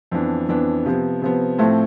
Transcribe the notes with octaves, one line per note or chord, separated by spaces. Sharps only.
F2 E3 B3 D4
F2 E3 B3 D4
C3 F3 B3
C3 F3 B3
A2 F3 A3 C4